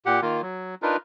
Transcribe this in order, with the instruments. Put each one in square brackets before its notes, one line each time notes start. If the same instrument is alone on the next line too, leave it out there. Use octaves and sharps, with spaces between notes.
[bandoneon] A#2 G4 F#5
D#3 A#3 F4
F#3
D4 D#4 F4 A#4 B4